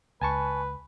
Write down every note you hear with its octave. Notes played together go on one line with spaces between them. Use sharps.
C#2 B4 G#5 A5 C#6